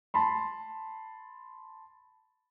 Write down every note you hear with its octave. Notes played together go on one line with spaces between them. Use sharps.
A5 B5 C6